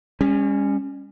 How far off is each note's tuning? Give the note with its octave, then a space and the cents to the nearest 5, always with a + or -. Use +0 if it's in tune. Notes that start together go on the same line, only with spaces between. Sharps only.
G3 +45 C#4 +0